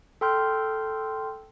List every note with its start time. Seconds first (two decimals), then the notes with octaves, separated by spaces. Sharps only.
0.21 A4 G5 C6 F6 G6